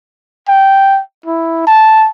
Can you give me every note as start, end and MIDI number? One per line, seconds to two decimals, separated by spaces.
0.48 1.00 79
1.26 1.65 64
1.67 2.08 81